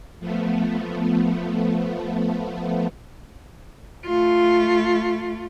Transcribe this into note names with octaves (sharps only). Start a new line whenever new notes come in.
F3 A3 B3
A3 F4